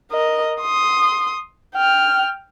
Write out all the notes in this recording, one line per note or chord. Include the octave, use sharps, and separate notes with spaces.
A#4 D#5
C6 D#6
G5 F6